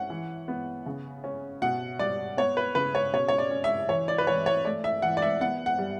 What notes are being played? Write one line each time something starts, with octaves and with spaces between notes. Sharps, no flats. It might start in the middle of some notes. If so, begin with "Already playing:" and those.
Already playing: C#4 F#5
E3
B3
C#3
C#4
B2 F#5
G3 D5
B3 C#5
B4
C#3 B4
C#5
B2 C#5
C#5
D5
C#4
E5
E3 C#5
D5
B4
E3 C#5
C#5
A3 D5
E5
E3 F#5
D5
E5
B3 F#5
F#5
G3